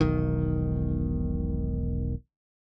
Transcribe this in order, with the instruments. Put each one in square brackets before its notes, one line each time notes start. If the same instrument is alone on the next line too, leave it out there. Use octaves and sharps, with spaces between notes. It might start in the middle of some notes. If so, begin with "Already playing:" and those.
[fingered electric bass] E1 B1 D#3